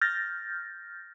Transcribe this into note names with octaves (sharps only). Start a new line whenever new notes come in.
F6 G6 A6 A#6